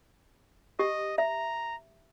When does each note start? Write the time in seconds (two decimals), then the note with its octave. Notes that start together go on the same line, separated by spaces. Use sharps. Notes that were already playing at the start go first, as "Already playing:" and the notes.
0.79 G4 D#5
1.18 E5 A#5